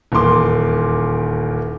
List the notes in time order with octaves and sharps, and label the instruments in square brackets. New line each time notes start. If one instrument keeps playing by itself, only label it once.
[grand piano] D#1 E2 A#3 C6 D6